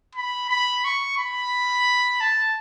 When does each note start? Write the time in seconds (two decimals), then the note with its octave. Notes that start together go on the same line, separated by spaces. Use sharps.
0.15 B5
0.50 B5
0.85 C#6
1.18 B5
2.21 A5